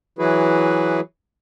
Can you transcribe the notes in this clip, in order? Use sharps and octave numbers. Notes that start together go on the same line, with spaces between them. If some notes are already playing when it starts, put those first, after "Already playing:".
E3 F#3 E4 F#4 G#4 B4